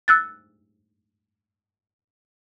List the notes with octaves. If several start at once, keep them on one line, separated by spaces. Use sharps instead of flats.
E6 F#6 A6